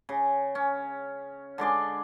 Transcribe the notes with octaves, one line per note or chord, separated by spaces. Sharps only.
C#3
C#4
D3 G#3 D5 C6